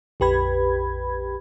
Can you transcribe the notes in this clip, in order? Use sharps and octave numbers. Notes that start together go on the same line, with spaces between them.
A#1 F2 G4 B4 B5 G#6